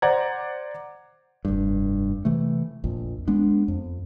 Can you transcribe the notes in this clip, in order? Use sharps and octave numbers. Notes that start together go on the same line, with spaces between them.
C5 D5 F#5 A#5 G#6
F1 G2
C3 E3 A3
A#1 F2
G#3 B3 D4
F2